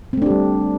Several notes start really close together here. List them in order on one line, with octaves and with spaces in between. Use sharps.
C4 A3 D4 G4 G3